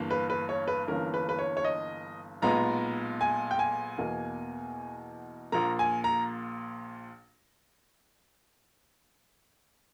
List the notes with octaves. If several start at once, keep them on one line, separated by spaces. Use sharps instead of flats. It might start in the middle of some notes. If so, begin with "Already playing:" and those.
Already playing: G1 G2 E3 A#3
B4
B4
C#5
B4
G1 G2 E3 A#3 C#4 A#4
B4
B4
C#5
C#5
D#5
B1 A#2 G#3 B3 A#5
G#5
G5
G#5
E2 B2 A#3
A#1 A#2 A#3 A#5
G#5
A#5